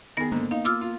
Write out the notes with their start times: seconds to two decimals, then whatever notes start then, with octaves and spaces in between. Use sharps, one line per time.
0.17 D#3 B3 G#4 A#6
0.32 G#2 D3 A#3
0.51 D#4 F5
0.65 F4 D6 E6 F6
0.81 F4